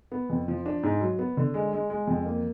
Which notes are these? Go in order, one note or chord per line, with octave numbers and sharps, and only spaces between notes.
B3
F2
F3
D4
G#2
F#3
B3
D3
G#3
G#3
G#3
F2
A#3